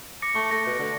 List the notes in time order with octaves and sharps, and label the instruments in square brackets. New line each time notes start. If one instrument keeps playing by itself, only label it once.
[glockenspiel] D6 A#6 C#7
[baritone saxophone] A3 [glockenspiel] C#6
[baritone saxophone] A3 [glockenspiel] A#6
[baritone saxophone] B2
D3